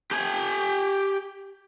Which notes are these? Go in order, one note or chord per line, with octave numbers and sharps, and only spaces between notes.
G4 G#5